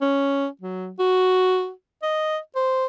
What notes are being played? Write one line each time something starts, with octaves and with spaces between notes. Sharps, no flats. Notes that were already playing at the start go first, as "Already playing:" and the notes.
C#4
F#3
F#4
D#5
C5